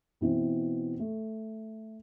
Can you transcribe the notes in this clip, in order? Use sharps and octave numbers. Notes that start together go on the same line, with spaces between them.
B2 E3 C4
A3